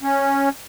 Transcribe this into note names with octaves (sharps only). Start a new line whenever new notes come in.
C#4